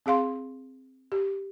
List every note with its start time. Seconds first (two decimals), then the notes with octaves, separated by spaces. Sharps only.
0.06 C4 G#4 F5 C6
1.12 G4